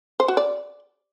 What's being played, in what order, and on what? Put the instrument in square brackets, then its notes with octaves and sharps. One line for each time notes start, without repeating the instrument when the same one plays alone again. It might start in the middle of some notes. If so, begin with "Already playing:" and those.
[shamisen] C5
F#4
D5